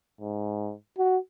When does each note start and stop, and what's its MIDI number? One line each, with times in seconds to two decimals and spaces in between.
0.21 0.73 44
0.98 1.17 66